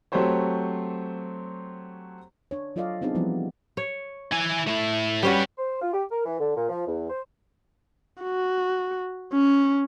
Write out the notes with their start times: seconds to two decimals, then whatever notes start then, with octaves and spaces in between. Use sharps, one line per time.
0.12 F#3 A3 C4 G4 C5 C#5
2.51 D4 C#5
2.76 F#3 F4 A4 D5 D#5 F5
3.01 B3 C4 D4 D#4 G#4
3.15 E3 F3 G3 B3 E4 F4
3.77 C#5
4.33 E4 G#5
4.68 A3 E4
5.23 G3 C#4 F#4 G4 B4
5.58 C5
5.82 F4
5.94 G4
6.10 A#4
6.26 E3
6.40 D3
6.56 A#2
6.69 F3
6.87 E2
7.10 C5
8.23 F#4
9.34 C#4